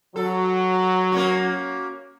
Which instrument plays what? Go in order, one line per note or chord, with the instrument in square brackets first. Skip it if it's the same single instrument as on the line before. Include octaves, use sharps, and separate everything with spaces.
[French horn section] F#3 [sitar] A4
[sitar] A#3 C#4 F#4